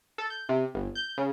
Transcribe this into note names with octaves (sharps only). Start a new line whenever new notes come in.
A4
G6
C3
G1
G6
C#3